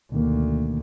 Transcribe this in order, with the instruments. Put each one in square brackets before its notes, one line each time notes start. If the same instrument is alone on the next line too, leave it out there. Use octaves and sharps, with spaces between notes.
[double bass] D2 [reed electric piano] B2 D#3 A#3